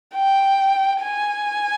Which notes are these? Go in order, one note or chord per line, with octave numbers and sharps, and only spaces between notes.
G5
G#5